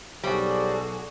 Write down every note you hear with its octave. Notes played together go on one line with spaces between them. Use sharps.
B1 G3 C#4 F#4 G#4 A4 C5 D5